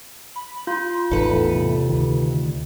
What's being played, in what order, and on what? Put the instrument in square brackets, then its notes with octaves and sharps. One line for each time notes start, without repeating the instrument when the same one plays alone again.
[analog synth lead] B5
[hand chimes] F4 [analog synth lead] C6
[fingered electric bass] A1 E2 G#2 [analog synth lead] D#4 [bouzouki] A4 B4
[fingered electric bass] E2 A2
[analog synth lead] C3
[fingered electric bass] D2 D#3